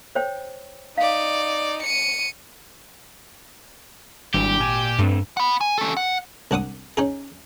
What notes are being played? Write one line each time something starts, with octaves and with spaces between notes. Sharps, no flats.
C5 C#5 G5
D#4 D5 F5
C#7 D#7
G#1 G3 D4 E4 G4
A#2 G#5
G2 A3 C4
F#5 B5
G#5
C#4 A4
F#5
C2 D4 F#5 D6 D#6
C#4 D#4 G#4